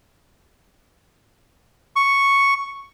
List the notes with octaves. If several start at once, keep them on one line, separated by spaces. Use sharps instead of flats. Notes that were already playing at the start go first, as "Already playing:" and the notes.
C#6